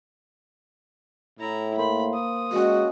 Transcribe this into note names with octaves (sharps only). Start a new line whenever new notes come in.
A2 E4 A#5
A#3 C5 B5
D#6
G#3 C#4 F#4 D#5